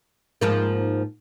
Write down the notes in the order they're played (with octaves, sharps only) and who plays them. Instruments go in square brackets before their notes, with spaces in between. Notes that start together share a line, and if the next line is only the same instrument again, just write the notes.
[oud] G#2 F3 A#3